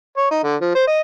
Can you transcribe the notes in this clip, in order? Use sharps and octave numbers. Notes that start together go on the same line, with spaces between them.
C#5
D#4
D3
F3
C5
D#5